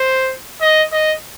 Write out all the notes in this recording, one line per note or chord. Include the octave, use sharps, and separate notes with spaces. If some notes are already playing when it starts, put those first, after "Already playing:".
Already playing: C5
D#5
D#5